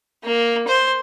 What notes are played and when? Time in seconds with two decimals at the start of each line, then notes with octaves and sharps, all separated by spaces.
0.24 A#3
0.68 C5